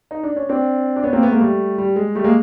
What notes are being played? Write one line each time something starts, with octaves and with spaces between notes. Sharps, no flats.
D#4
D4
C#4
C4 D4
D4
B3 C#4
A#3 C4
A3 B3
G#3 A#3
G3 A3
G3
G#3
G3 A3
G#3 A#3